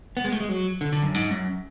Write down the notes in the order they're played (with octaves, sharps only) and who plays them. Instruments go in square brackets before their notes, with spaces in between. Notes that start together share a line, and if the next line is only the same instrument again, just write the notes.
[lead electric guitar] B3
G#3
A3
G#3
F#3
D3
D3
F#2
G#2
F#2